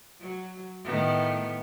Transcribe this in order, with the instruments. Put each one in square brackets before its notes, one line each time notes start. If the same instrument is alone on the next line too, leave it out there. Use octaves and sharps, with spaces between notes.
[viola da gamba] F#3
A2 D#3 B3